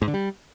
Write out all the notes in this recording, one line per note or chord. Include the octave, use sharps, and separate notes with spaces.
G#2
D3
G3